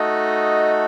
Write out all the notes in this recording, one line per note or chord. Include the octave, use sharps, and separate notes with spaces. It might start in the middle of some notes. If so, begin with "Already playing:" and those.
Already playing: A3 D#4 F#4 A4 D#5